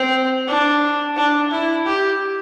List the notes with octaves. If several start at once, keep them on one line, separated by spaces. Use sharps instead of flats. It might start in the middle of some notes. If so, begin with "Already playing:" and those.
Already playing: C4
D4
D4
E4
G4